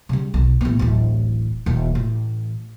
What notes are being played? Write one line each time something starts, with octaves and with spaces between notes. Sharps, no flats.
C#3 G3
B1
A1 B3
D1 A1
D#1
A1